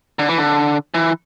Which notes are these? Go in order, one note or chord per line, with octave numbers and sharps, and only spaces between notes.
D3
E3
D3
E3